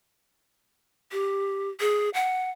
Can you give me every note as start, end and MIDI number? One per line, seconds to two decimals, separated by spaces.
1.12 1.70 67
1.80 2.09 68
2.14 2.50 78